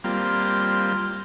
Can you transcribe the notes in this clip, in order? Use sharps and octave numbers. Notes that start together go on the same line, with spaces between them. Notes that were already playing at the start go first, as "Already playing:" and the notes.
G3 A#3 C4 F4